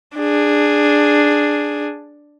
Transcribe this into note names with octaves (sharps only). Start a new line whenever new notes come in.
D4 G#4